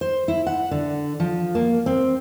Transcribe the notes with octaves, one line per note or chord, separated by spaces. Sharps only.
C5
E4
F#5
D3
F3
A#3
C4